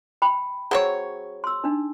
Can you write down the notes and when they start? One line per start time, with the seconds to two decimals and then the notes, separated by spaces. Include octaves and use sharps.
0.22 G5 B5
0.71 F#3 C4 G#4 C#5
1.44 C6 E6
1.64 D4 D#4